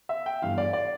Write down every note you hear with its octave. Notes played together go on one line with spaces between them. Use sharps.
E5
G5
G1 G2 E3 F5
D5
D5